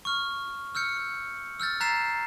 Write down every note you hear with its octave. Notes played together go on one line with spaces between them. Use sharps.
C#6 F6
E6 F6 G6 C#7
E6 F6 G6 A6
A#5 F#6 A6 B6 C7 E7